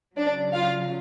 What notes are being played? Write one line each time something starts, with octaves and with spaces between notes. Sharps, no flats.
C#3 F#3 D4 D5
F4 F5